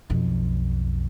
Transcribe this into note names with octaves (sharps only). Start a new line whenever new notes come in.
B1 F2